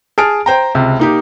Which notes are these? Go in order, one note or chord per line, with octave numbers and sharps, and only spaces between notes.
G#4 A5 F6 D7
C5 G5 A#5
C#2 C3
A#3 D#4 G4